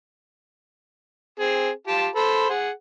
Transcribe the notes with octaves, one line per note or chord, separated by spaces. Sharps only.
C4 G#4
F4 G4 A5
A4 C5 B5
G#4 F#5